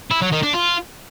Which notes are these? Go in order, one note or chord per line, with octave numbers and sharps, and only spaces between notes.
E4
F#3
D#3
D4
F4